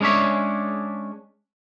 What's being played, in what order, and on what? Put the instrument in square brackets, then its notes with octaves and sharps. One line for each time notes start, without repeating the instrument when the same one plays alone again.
[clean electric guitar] G#3 C#4 D4 C#5 E5